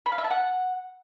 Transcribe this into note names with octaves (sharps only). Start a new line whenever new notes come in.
B5
F5
E5
A5
F#5